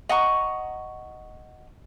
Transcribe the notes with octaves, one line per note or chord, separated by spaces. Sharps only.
D#5 F#5 A#5 C#6